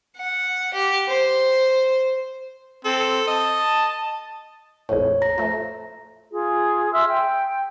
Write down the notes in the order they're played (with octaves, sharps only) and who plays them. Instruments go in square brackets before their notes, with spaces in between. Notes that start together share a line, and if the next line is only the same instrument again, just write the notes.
[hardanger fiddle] F#5
G4
C5
[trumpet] C4 [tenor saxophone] A4
[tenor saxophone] D#5 [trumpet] A5
[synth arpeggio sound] A#1 F2 A2 [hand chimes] C#5
[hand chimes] A#5 A#6
[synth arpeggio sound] F3 A3 [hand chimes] A#5
[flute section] F4 G#4
E5 C6 E6 F6
G5